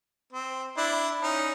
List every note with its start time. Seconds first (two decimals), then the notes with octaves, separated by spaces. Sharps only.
0.33 C4
0.77 D4 E4
1.22 C#4 D#4